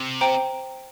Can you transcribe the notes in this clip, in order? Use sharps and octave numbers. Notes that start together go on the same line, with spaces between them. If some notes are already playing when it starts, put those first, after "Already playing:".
Already playing: C3
C5 G5 A#5